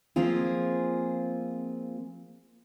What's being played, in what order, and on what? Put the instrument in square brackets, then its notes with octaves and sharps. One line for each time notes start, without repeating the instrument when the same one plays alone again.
[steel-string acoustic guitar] F3 A#3 C4 F4 G#4